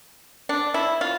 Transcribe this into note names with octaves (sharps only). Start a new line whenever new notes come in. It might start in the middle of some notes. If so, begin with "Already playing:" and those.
D4
E4
F4